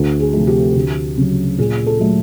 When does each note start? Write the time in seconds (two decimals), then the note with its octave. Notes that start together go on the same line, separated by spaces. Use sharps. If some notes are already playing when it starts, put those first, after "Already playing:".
Already playing: D2
0.20 G#4
0.33 C3 F3 A3
0.47 G4
0.76 D2
1.17 C#3 F#3
1.58 A#2 G#4
1.86 A4
2.00 F#3 A3